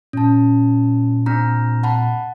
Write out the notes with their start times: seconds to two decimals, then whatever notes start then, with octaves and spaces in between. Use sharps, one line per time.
0.13 A#2 C#4 A5
1.26 C4 D4 A#5
1.83 F#5 A5 B5